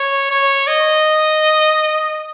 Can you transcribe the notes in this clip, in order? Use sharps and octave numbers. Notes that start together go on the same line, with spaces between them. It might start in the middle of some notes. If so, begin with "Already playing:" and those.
Already playing: C#5
C#5
D#5